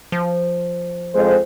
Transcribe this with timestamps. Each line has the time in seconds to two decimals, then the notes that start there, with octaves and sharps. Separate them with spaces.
0.12 F3
1.15 F2 G#3 C5